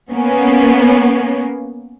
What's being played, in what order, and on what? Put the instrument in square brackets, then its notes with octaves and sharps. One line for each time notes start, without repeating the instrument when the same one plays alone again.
[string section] A#3 B3 C#4